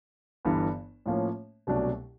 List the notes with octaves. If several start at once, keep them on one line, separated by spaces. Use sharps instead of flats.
G1 G2 E3
A2 F3 A#3 C#4
C2 B2 F#3 A3 D4